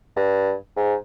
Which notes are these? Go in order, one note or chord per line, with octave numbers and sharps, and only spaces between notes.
G2
G#2